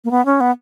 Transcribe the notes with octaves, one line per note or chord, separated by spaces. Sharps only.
A#3
B3
C#4
B3